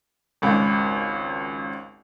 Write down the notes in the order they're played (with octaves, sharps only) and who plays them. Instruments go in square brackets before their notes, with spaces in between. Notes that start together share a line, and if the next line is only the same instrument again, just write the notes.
[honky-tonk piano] G#1 C#2